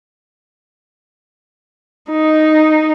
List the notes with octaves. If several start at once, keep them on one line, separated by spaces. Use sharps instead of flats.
D#4